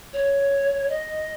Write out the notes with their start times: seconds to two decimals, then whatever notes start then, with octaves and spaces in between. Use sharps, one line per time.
0.13 C#5
0.89 D#5